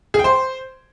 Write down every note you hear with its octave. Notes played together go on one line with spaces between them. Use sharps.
G#4
G5
C5